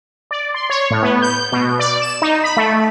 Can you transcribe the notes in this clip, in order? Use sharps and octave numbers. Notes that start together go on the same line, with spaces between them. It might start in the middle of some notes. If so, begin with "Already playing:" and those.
D5
C6
C#5
A2
B3
G6
B2
D5
E7
D#4
B5
A3